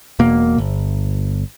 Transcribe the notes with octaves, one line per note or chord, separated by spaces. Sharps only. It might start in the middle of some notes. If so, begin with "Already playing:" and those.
E1 B2 A#3
G1